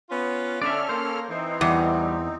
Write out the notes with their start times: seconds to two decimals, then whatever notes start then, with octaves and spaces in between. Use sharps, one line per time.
0.10 B3 C#4 F4
0.62 D3 C#4 A4 D5 E5 F6
0.89 A#3 C5
1.29 E3 C4 D#4
1.61 E2 G3